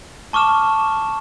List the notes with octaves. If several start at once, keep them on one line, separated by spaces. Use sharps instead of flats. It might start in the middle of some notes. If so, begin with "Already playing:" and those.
A5 C#6 D6 F6 E7